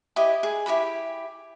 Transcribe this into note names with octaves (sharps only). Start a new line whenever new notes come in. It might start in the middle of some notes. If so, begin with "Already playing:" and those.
E4 G4 D#5
G#4
E4 G4 G#4 B5